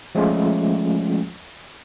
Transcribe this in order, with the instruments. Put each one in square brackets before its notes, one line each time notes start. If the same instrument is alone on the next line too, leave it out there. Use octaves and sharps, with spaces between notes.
[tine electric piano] F3 G#3 A3 C#4 F4